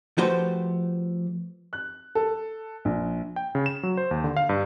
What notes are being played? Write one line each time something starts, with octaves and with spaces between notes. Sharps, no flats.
F3 A3 F#4 G4 B4 C5
F#6
A4
A#1
G5
C#3
E7
F#3
C5
D#2
D3
F5
G2